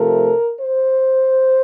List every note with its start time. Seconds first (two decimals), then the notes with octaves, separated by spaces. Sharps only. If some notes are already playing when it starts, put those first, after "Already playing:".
Already playing: C3 F3 A3 A#4
0.61 C5